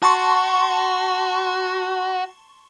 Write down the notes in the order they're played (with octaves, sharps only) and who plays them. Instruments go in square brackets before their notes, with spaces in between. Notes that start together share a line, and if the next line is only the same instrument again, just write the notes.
[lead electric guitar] F#4 [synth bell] A5 C6 C#6